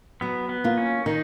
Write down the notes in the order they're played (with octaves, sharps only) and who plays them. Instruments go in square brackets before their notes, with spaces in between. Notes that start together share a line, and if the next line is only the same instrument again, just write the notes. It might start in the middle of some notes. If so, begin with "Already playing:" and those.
[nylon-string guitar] F#3 [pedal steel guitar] B3
[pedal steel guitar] B3
[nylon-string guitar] A#3 F4
[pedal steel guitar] C#4
[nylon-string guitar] D#3 [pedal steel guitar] D#4